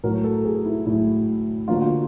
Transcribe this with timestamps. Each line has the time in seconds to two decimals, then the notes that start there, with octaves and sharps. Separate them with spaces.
0.03 A2 F#3 A3 A#4
0.24 A4
0.45 G#4
0.65 E4
0.86 A2 F#3 A3 E4
1.68 D3 F3 A#3 F4
1.76 F#4
1.82 F4